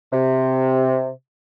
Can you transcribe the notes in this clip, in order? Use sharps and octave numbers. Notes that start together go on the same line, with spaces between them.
C3